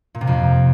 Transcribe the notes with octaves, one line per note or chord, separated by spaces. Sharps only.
A#2
C3
F2